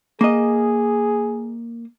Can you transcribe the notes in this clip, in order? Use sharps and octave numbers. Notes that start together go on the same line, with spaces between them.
A#3 G#4 D#5